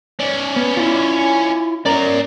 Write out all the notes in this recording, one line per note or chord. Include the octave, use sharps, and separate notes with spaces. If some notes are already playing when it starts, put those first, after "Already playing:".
C#4 D5
B3
E4 F4
C#4 A#4 D5 A#5